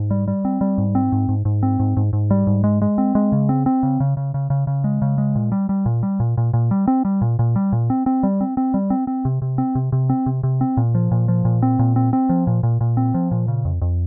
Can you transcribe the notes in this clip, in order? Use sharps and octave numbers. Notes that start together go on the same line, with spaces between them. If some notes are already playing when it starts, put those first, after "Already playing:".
Already playing: G#2
G3
G3
C4
G3
G#2
C4
G#2
G#2
G#2
C4
G#2
G#2
G#2
G3
G#2
G#3
G#3
C4
G#3
C#3
C4
C4
C#3
C#3
C#3
C#3
C#3
C#3
G#3
C#3
G#3
A#2
G3
G3
A#2
G3
A#2
A#2
A#2
G3
C4
G3
A#2
A#2
G3
A#2
C4
C4
G3
C4
C4
G3
C4
C4
C3
C3
C4
C3
C3
C4
C3
C3
C4
A#2
F3
A#2
F3
A#2
C4
A#2
C4
C4
F3
A#2
A#2
A#2
C4
F3
A#2
C#3
F2
F2